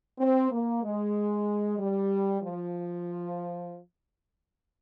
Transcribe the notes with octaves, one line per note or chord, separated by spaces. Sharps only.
C4
A#3
G#3
G3
F3